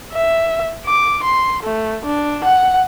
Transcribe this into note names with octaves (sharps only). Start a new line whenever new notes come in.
E5
D6
C6
A3
D4
F#5